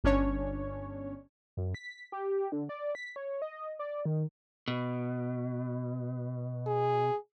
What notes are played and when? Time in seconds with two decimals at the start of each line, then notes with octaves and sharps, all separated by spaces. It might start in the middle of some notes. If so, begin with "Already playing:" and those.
0.04 G1 C#4 D4 C#5
1.57 F#2
1.75 B6
2.12 G4
2.52 D3
2.69 D5
2.95 B6
3.16 C#5
3.42 D#5
3.79 D5
4.05 D#3
4.68 B2
6.67 G#4